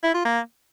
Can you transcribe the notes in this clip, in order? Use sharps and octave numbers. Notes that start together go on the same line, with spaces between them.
E4
F4
A#3